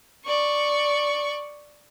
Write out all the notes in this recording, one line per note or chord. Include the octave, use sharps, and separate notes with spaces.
D5 C#6